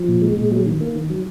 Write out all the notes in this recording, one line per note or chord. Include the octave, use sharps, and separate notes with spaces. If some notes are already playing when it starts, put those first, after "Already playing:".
Already playing: F3
A#2
G#3
A#2
F#3
D#3
A#3
D#3
F#3